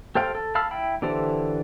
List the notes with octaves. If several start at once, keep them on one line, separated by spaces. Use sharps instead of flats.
G4 A4 C5 F5 G5
A4
F5 A5 B5 E6 F6
E4 G5 B5
D3 E3 G4 A4 C5